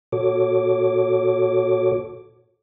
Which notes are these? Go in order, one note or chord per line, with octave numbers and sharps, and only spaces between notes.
A#2 F#4 A4 C#5 D6